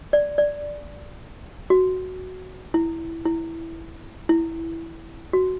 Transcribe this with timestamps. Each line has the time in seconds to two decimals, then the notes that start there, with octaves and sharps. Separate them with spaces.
0.13 D5
0.38 D5
1.70 F#4
2.74 E4
3.26 E4
4.29 E4
5.33 F#4